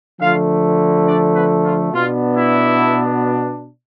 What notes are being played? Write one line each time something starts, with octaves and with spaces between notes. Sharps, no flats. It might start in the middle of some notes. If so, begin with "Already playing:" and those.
D3 F3 A3 F4 F5
D4 D5
B3 B4
F4
B2 B3 D4 F4
E4